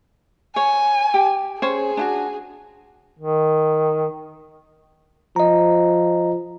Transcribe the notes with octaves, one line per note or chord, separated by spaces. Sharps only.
C#5 G#5
G4
C#4 G#4 C5 C#5
D4 E4 F#4
D#3
F3 D#5 A#5